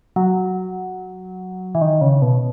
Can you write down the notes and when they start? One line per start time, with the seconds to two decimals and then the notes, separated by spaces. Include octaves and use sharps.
0.16 F#3
1.75 E3
1.81 D#3
2.01 C#3
2.22 B2